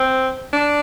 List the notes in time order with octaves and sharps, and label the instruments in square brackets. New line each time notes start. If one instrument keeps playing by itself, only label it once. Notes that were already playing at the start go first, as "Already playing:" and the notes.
Already playing: [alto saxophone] C4
D4